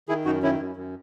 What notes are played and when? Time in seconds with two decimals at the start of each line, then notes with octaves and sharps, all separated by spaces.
0.09 D#3 E4 G#4
0.25 F#2 D#4 F#4
0.42 D#3 C#4 E4
0.59 F#2
0.76 F#2